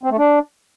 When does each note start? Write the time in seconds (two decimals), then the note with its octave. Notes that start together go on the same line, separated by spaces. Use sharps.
0.03 C4
0.11 A3
0.18 D4